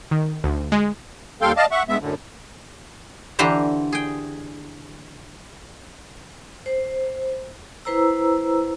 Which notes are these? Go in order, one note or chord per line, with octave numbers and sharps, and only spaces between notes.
D#3
D2
G#3
D#2 G3 A4 F5 G5 C6
D5 D#5 F5 A5
E5 F#5 C#6
G2 G#3 B3 E5
F#2 A2 D3
D3 E3 G4 C5 A#5
G#4 G5
C5
E4 B4 C5 A#5 E6